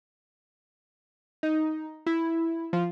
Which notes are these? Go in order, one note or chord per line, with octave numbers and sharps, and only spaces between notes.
D#4
E4
F3